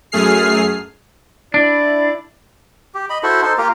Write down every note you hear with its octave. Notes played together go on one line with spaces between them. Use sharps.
F#2 A3 G#4 F6 C7
D4 E4 D5
G4
D#5 B5
E4 F#4 A4 C5
D#4 A4 C5
A#3 F4 G4 A#4